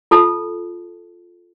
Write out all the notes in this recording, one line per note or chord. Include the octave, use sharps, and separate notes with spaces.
F4 A4 A5